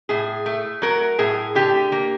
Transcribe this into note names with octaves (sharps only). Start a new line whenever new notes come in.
A2 G#4
A3
F#3 A#4
A2 G#4
D3 G4
A#3